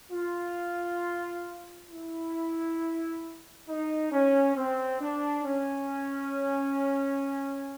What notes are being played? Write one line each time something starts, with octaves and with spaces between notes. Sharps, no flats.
F4
E4
D#4
C#4
C4
D4
C#4